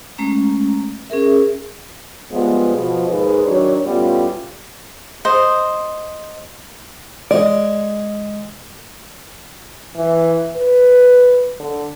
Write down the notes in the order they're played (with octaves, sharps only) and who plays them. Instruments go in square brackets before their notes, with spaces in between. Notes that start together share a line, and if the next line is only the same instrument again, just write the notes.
[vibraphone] G#3 A3 C#4 A#5
C#4 G#4 A#4 E5
[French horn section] F3 G3 G#3 B3
B2 F3
D#2 G#2 G#4 B4
D#3 F#3 D4 C#5
A2 G3 B3 C#4 F4
[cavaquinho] C5 D#5
[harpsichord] G#3 [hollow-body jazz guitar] D5
[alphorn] E3
B4
D3